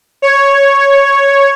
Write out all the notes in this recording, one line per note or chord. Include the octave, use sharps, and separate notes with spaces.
C#5